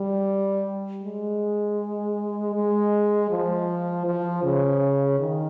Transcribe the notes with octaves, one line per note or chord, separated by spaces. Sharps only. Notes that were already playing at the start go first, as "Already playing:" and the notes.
Already playing: G3
G#3
G#3
F3
F3
C#3
D#3